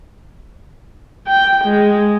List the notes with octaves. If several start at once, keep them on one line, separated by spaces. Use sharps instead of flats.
G5
G#3